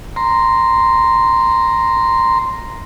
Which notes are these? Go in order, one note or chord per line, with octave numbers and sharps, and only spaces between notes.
A#5 C6